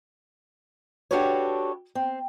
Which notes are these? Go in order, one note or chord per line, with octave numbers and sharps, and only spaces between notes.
D4 F#4 G4 A4 B4 C#5
C4